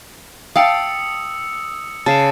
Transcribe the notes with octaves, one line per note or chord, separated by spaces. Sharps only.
F5 G5 A5 D#6 E6 C#7
C#3 A5 A6 C7 E7